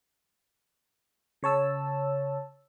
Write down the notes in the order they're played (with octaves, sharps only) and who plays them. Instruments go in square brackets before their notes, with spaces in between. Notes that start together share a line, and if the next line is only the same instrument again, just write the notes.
[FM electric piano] C#3 C#5 A5 E6